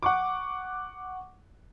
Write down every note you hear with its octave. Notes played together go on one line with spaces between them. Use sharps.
F#5 C#6 D6